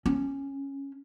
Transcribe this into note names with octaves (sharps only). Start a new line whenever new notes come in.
C#4